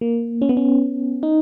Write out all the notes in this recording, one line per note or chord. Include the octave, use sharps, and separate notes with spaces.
A#3
C#4
B3
C#4
D#4